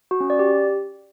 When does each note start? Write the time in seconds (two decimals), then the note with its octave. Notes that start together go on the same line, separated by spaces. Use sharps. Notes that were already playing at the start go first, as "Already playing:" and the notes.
0.11 F#4
0.20 C#4
0.30 D5
0.39 G4